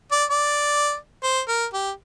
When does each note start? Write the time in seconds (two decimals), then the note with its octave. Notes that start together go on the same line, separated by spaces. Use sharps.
0.12 D5
0.30 D5
1.23 C5
1.48 A#4
1.73 G4